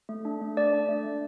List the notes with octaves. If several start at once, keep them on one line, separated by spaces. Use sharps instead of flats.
A3
D4
A3
A3 D5
D4
A3
A3